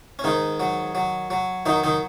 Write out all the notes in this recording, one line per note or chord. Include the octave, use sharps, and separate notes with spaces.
C#4
G#2 D#3 D#4
F#3
F#3
F#3
D#3 F#3 D#4
D#3 D#4